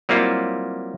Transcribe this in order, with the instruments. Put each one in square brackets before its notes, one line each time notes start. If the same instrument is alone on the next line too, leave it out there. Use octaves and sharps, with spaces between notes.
[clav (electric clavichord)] F#3 G3 A#3 C4 E4 F4